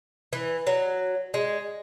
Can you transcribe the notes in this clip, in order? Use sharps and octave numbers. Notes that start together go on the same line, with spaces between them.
E3
F#3
G#3